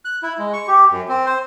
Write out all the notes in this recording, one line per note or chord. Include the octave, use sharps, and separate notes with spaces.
F#6
E4
G#3
C#6
G4
F#2
C4
C5